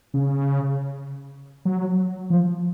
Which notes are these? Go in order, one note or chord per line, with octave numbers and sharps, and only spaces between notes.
C#3
F#3
F3